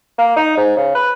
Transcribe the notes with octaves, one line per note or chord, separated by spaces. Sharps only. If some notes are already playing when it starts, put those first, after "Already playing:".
A#3
D#4
G#2
C#3
B4